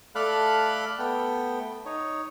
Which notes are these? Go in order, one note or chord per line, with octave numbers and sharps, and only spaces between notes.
A3 A4 D5 F5 B5 F#6
A3 B3 G5
D#4 C#5